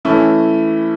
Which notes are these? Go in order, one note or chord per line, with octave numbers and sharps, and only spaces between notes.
E3 A3 C#4 E4